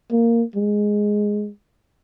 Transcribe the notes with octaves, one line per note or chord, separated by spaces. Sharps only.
A#3
G#3